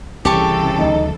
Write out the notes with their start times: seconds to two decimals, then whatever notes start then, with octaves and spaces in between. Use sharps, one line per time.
0.25 C2 C#3 E3 G4 A4 A5 C#6
0.79 D2 F#3 A3 D#4